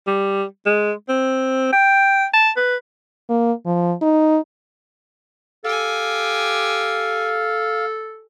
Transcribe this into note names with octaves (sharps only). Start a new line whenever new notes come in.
G3
G#3
C4
G5
A5
B4
A#3
F3
D#4
G4 A4 F5 G#5